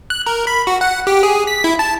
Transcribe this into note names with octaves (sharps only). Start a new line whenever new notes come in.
F#6
A#4
B5
F#4
F#5
G4
G#4
B6
E4
A5